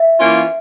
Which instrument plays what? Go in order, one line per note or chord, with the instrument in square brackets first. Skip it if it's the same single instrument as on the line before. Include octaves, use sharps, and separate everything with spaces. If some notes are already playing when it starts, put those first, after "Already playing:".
Already playing: [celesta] E5
[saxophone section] E3 A#3 C#4 F4